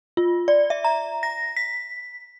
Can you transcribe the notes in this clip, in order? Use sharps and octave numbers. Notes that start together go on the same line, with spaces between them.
F4
D5
E5
A#5
A#6
B6